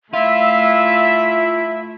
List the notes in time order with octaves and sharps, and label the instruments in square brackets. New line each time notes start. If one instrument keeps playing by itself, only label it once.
[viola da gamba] A3 [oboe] E4 [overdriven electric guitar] F4 [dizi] E5